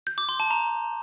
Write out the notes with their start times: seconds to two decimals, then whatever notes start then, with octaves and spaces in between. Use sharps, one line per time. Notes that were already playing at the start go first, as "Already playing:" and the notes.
0.07 G6
0.18 D6
0.29 C6
0.40 A5
0.51 A#5